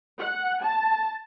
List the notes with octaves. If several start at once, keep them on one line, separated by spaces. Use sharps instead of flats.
F#5
A5